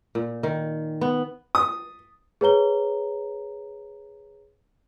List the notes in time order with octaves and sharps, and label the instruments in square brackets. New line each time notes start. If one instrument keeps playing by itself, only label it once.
[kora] A#2
D#3
B3
[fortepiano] D#6
[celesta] G#4 B4 C#5 A#5 G7